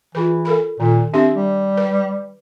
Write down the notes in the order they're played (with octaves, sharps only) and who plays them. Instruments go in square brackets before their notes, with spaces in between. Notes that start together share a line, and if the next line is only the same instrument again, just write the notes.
[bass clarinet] E3 [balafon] F4 G#4 B4
[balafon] A4 A#4 B5
[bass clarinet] A#2 [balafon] D#3
[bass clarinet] C4 [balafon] D4 G4 E5
[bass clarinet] G3
[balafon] B4